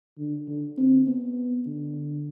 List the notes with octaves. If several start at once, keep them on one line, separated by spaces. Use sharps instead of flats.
D3
D3
C4
B3
D3